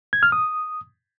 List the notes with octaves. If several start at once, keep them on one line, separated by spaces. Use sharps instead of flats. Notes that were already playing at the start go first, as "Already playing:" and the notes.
G#6
F6
D#6